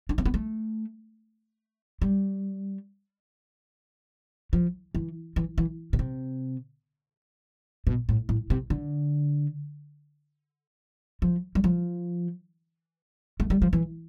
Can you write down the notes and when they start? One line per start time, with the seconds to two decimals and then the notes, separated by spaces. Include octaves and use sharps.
0.09 D4
0.18 C4
0.26 B3
0.34 A3
2.02 G3
4.53 F3
4.95 E3
5.36 E3
5.58 E3
5.93 B2
5.99 C3
7.87 B2
8.09 A2
8.29 A2
8.50 C3
8.70 D3
11.22 F3
11.55 G3
11.64 F3
13.40 A3
13.50 G3
13.62 F3
13.73 E3